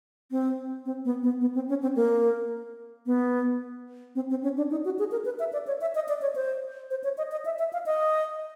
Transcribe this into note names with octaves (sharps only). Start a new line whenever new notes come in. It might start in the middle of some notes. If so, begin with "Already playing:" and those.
C4
C4
B3
B3
B3
C4
C#4
C4
A#3
B3
C4
C4
C#4
D4
D#4
F#4
G#4
A#4
B4
E5
D5
C#5
E5
D#5
D5
C#5
C5
C5
C#5
D#5
D#5
E5
E5
F5
D#5